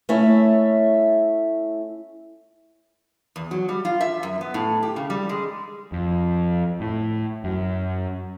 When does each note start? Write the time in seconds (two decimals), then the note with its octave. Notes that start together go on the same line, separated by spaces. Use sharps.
0.09 A3 C#4 E4 C#5 E5
3.36 E2
3.51 F#3
3.69 G3
3.85 F4
4.01 E5
4.23 F#2
4.41 B3
4.54 A2
4.83 G4
4.96 C#3
5.10 G3
5.29 G#3
5.92 F2
6.80 A2
7.44 F#2